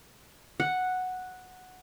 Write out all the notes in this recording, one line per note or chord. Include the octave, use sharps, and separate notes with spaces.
F#5